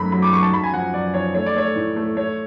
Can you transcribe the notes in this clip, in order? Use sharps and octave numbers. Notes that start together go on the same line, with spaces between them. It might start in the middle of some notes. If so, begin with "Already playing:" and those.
Already playing: F#2 A3 B5
F#3 B5
D6
F#3 C#6
A5
F#2 B5
G#5
F3 F#5
F#2 D5
F3 C#5
A3 C#5
D5
A3 C#5
A2
A3
A3 C#5